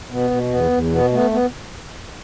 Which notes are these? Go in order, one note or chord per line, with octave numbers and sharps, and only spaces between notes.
B2 B3
B2
E2 B3
E2
B2 B3
A3 B3
B3